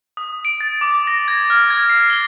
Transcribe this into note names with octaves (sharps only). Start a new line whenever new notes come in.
D#6
D7
A6
D6
A#6
G#6
F6
G#6
C7
G7